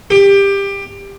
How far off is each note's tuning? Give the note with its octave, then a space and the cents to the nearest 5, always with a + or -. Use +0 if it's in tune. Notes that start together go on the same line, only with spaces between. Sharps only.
G4 +20